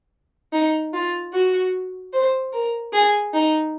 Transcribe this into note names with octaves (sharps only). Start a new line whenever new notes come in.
D#4
F4
F#4
C5
A#4
G#4
D#4